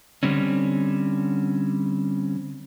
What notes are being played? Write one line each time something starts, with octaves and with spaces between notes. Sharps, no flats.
D3 G3 C4 C#4